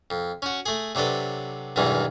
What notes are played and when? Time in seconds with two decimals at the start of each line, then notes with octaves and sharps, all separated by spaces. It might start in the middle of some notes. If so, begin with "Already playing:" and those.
0.10 F2
0.42 C#4 F#4
0.66 A3 G#4
0.95 C3 F#3 D4 A4 B4
1.76 B1 E2 G2 D#3 E3 G#3